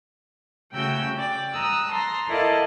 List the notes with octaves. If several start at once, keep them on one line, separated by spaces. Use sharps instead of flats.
C#3 A3 F#4 G5 E6 G6
D5 G5 D6
A#5 D#6 E6 F#6
A5 A#5 C6 A#6
E4 A4 A#4 D5 D#5 F5